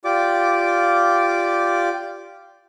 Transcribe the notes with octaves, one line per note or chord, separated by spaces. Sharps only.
F4 G4 D5 D6